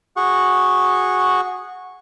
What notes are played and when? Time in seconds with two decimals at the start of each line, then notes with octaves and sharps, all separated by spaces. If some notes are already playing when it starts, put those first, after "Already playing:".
0.17 F#4 G#4 F#5 C#6